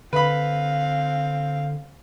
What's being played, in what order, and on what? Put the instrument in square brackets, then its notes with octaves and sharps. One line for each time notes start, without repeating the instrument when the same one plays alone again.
[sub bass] D3 [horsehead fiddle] C4 F5 [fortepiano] B4 B5